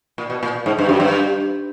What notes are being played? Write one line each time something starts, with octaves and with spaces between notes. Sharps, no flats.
A#2
B2
A#2
G#2
G2
F#2
G2